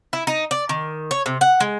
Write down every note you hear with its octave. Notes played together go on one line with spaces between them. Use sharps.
E4
D#4
D5
D#3
C#5
C3
F#5
G#3